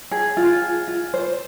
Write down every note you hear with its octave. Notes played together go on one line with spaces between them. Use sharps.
G#4
F4
G#4
F4
C5